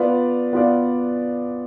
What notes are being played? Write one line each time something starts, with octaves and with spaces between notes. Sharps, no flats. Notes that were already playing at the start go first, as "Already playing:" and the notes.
Already playing: B3 F4 B4 D5 F5
B3 F4 B4 D5 F5